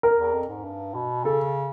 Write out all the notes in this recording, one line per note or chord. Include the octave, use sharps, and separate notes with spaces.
A#4
E2
F2
G#2
G2
B2
C#3 A4